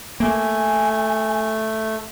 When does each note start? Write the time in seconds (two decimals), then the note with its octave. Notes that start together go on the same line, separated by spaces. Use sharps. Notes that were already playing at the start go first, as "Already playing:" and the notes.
0.20 A3 A#3 G#5